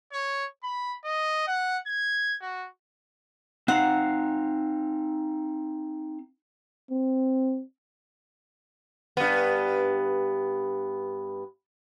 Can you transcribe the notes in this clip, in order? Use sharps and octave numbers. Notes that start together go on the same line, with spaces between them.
C#5
B5
D#5
F#5
G#6
F#4
C4 D#4 F5 F#5
C4
G2 B3